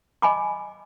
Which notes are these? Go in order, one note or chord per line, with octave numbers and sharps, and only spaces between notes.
D#5 G#5 B5 D6